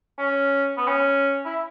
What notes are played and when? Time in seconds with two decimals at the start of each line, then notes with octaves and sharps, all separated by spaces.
0.18 C#4
0.77 B3
0.87 C#4
1.45 E4